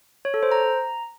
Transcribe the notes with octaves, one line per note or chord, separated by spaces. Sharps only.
C#5
A4
C5
A#5